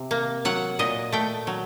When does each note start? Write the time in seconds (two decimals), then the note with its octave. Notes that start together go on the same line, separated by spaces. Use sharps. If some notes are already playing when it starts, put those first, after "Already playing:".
Already playing: C3
0.11 A#3
0.45 F#3 F#5
0.79 A#2 D#5
1.12 A3 G5
1.47 F#3